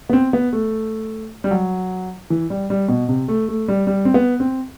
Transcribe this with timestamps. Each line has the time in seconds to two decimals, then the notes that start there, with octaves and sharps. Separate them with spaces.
0.09 B3
0.13 C4
0.33 B3
0.53 A3
1.44 G3
1.51 F#3
2.30 E3
2.50 G3
2.70 G3
2.88 B2
3.08 C3
3.28 A3
3.49 A3
3.68 G3
3.87 G3
4.05 C4
4.14 B3
4.40 C4